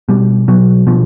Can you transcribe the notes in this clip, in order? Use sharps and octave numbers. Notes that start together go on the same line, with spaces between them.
B2 G3
B2 F#3
B2 F3